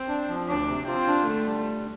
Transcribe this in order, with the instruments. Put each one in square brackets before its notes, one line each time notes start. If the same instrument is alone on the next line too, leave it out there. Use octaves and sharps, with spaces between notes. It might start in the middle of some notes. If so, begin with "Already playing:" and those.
Already playing: [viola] C4
[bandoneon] D4
F3
[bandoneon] D2 [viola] D4
[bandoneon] C3
[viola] C4 [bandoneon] F4
[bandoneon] D4
[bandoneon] D3 [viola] A3
[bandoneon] G3